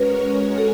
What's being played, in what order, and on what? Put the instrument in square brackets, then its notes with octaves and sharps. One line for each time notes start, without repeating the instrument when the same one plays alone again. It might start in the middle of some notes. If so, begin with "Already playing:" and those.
Already playing: [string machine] G#3 C#4 F#4 A#4 C#5 [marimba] B4
[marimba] A4